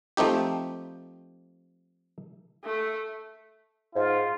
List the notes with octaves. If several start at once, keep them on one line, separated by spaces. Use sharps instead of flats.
F3 A3 C4 D#4 G4
A3
G#2 F4